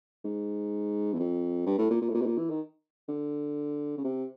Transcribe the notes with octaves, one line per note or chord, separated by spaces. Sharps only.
G#2
E2
F2
G2
A2
A#2
A#2
A2
A#2
B2
A#2
E3
D#3
D3
C#3
C3